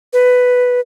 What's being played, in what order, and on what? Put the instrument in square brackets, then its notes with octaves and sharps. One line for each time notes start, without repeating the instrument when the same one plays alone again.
[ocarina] B4